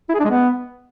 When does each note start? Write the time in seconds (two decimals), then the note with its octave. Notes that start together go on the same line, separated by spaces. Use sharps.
0.09 E4
0.14 G#4
0.20 D4
0.25 G#3
0.30 B3